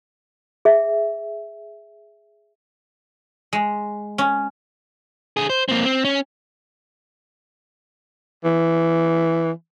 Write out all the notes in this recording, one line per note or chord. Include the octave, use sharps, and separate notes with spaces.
G#4 E5
G#3
C#4
D3 G#4
C5
A#3 C4
C4
C#4
E3